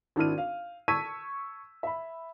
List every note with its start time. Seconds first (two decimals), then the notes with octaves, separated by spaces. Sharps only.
0.16 G#1 D4 E4 F6 D#7
0.38 F5
0.88 A5 C#6 E6 G#6 B6 D#7
1.83 E5 B5